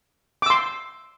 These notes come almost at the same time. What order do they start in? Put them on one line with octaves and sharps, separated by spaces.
D6 E6 C6